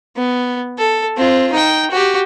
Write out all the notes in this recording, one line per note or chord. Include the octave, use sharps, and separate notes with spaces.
B3
A4
C4 F4
D#4 G5
F#4 G4